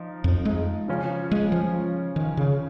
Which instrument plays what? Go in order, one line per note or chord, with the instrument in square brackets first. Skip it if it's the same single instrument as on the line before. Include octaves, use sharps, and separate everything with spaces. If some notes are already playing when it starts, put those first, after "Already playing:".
Already playing: [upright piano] F3 D#4
[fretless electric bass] F2
G#3
[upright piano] C#3 F3 C#4
[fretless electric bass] G#3
F3
D#3
C#3